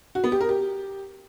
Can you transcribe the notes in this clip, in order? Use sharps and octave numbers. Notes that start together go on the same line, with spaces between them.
F#4
B3
G4
A#4
G4